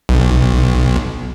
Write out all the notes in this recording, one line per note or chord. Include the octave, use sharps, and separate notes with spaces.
B1